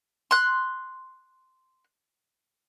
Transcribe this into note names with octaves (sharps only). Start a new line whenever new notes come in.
C6 F#6